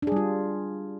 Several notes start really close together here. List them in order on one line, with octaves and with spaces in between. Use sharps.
D4 G#4 G3 F4